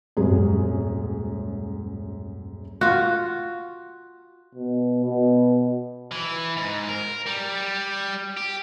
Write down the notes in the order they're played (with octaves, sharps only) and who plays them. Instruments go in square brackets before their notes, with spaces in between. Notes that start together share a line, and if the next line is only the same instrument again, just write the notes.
[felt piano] D#1 G#1 F#2 G#4
[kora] F4 F#4
[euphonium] B2
B2
[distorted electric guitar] E3
G#2
A#4
G3
G4